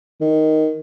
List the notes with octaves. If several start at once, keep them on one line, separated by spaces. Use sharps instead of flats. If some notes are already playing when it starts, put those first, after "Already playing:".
D#3